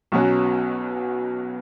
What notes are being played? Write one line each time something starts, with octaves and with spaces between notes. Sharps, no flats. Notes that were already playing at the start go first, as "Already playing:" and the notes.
B1 B2 F#3 C#4 F#4